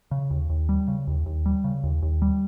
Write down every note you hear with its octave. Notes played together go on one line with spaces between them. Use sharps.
C#3
D#2
D#2
G3
C#3
D#2
D#2
G3
C#3
D#2
D#2
G3